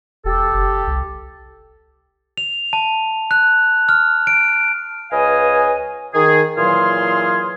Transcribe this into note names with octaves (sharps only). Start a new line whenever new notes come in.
E1 G4 A4
F#1
C2
F7
A5
F#6
F6
D7
C#2 B4 C#5 D#5 F5 G#5
D#3 G#4
A#2 E3 F#3 G#4 F5 C6